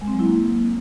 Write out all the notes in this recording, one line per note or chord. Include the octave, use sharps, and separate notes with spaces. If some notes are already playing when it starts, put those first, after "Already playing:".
G#3
C4
F#3
E4
A#3